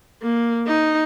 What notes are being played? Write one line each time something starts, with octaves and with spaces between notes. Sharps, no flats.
A#3
D#4